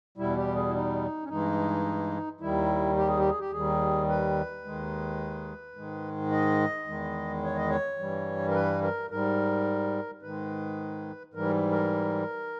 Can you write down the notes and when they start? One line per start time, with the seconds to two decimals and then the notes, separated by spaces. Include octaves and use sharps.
0.18 E2 B2 G3 E4
0.37 G4
0.55 G#4
0.68 E4
0.74 D#4
1.24 C#4
1.29 G2 E3 G#3 D#4
2.41 D#2 D#3 G3 E4
2.97 G4
3.08 G#4
3.18 G4
3.28 G#4
3.40 G4
3.52 D#2 D#3 G3 G#4
4.08 B4
4.64 D#2 D#3 G#3
5.76 G#2 D#3 G#3
6.32 D#5
6.87 E2 D#3 G#3
7.43 C#5
7.56 D#5
7.70 C#5
7.99 G2 E3 G3
8.49 A#4
8.54 B4
8.83 A#4
9.10 G#2 G3 A#4
10.22 G#2 D#3 G#3 B4
11.34 G#2 E3 G3 A#4
11.71 A#4